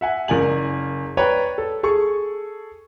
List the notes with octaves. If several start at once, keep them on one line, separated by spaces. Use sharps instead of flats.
E5 F#5 G#5
F#1 A#4 D5 G#5 F#7
B4 C#5 D5 G5 A#5
A4
G#4 A4 C#6